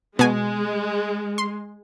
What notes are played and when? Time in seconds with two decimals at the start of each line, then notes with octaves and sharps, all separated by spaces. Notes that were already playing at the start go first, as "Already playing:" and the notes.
0.19 B2 G#3 G#5
1.38 C6